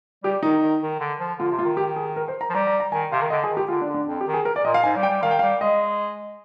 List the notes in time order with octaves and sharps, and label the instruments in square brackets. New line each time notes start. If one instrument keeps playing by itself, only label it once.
[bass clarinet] G3 [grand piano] G4
[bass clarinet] D#3 [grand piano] D#4
[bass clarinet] D#3
D#3
D3
F3
[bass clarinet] D3 [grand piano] F4
[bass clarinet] C3
[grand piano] F4
[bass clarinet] D#3
[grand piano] G4
G#4
A#4
C5
A#5
[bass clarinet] F3
[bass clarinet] G3 [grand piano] A#5
[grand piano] A#5
A#5
[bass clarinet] D#3 [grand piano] G#5
[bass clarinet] C3 [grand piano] F5
[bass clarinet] D#3
[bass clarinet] D3 [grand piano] D#5
[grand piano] G#4
[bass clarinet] D#3
[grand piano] G4
[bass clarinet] D3 [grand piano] F4
[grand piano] D4
[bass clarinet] D3
[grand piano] D4
[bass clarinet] F2
[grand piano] G4
[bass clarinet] D#3
[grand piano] G#4
A#4
D5
[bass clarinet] A#2 [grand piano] D#5
[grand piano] F5
[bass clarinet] G#2 [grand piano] G#5
[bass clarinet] G3
[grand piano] G5
[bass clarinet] G3
[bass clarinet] D#3 [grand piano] F5
[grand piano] G5
[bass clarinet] G3 [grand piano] F5
[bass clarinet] G#3 [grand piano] D#5